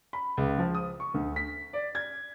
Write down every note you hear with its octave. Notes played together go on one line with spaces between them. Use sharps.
B5
C#2
F3
D#6
C#6
D2
B6
D5
G#6